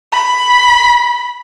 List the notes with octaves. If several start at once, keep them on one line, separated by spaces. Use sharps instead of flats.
B5